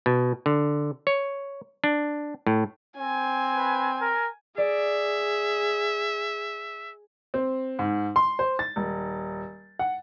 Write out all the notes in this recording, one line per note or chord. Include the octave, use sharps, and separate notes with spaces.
B2
D3
C#5
D4
A2
C4 G#5
B4
A#4
G#4 D5 E5 D7
C4
G#2
C6
C5
A6
D#1
F#5